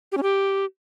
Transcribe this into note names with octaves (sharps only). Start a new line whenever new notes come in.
G4
C#4
G4